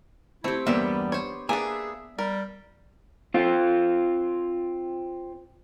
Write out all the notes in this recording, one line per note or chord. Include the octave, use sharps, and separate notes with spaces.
A3 C4 E4 G4
E2 G2 G3 A#3 B3 D4 G4 E5
C5 C#5
A#3 B3 D4 G#4 E5 G#5
G3 A#4
C4 F4